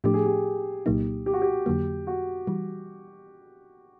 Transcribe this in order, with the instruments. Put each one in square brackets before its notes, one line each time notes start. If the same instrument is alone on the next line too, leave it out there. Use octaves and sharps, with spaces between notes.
[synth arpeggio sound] A2 F3 A3 D4 [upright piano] G4
[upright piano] G#4
G4
[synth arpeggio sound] C2 A#2 F#3 A#3 D#4
[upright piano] G4
F#4
G4
[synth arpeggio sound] F2 D3 F#3 A#3
[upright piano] F#4
[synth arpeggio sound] E3 G3